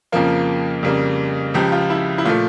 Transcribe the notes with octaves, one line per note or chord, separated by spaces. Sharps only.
F2 C#3 F3 A#3 F4
F2 C#3 G3 A#3
C#2 C#3 F3 G4
F4
E4
E4
A#2 F3 A3 F4